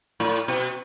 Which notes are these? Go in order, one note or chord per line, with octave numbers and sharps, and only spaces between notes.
A2
B2